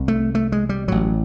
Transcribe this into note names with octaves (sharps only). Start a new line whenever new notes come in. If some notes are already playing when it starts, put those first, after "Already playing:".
Already playing: C2 C3
A3
A3
G#3
G3
A1 A2 F#3